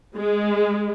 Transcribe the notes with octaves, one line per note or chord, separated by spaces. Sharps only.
G#3